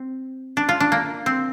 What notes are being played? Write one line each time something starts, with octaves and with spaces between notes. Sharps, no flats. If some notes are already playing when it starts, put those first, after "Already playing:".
Already playing: C4
D4
F4
D4
A#3
C4